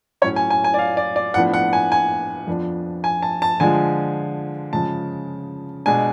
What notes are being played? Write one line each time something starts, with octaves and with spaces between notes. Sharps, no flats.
A2 F#3 C#4 C#5
G#5
G#5
G#5
D5
F5
D5
D5
A2 F3 B3 D4 F#5
F#5
G#5
G#5
F2 F3 B3 D4
G#5
A5
A5
D3 F3 G#3 G#5
C#3 F3 G#3 A5
B2 G#3 D4 G#5